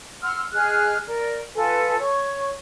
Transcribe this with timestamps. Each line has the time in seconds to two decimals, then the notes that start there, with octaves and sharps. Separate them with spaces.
0.22 F#5 C6 E6 F6
0.53 G#4 D#5 F6 F#6
1.07 A#4 D5
1.55 F4 A4 B4 G#5
1.98 C#5 C#6